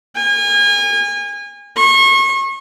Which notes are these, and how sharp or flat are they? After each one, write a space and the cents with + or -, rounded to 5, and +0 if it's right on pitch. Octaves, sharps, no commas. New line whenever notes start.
G#5 -35
C#6 -35